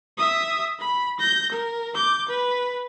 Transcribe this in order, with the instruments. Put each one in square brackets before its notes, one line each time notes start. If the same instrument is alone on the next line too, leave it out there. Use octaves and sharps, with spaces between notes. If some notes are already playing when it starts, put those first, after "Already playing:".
[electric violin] E5 D#6
B5
G6 A#6
A#4
D6 G6
B4